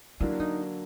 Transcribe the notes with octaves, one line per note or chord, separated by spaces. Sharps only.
D3 F#3 A#3 D4 E4
D#4